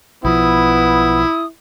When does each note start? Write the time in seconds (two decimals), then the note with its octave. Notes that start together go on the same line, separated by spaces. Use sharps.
0.25 B1 F3 B3 E4 D#6